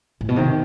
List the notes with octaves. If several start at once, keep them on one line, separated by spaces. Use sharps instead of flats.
A2
B2
C3 D#3